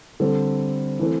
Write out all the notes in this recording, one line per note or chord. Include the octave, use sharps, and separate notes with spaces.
D3 G3 C4 A4
E3 A3 C4